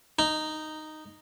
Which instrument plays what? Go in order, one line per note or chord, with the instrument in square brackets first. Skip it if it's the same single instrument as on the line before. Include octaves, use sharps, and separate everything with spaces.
[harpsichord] D#4